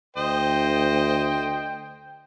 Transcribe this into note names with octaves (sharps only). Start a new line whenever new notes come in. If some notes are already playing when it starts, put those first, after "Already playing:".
D2 C5 D#5 G5